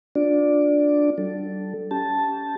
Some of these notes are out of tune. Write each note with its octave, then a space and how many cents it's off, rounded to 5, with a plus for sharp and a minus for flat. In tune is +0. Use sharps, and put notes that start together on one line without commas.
D4 +0 F4 +40 D5 +0
G3 -45 A4 +0
C#4 +35 G4 +0 A5 +0